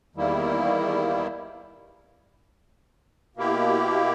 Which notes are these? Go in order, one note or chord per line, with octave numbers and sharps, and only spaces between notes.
E2 D#3 G3 A#3 E4
B2 A#3 E4 G4